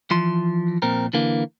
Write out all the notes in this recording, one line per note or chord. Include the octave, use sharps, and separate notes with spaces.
E3 F3 C6
F2 A#2 C4 A#4
D3 E3 A#3